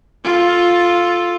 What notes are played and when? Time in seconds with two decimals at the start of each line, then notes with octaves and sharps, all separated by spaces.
0.24 F4 A4